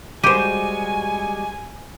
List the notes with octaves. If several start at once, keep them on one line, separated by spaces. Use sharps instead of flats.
G3 G#3 F#4 G4 C5 G#5 D#7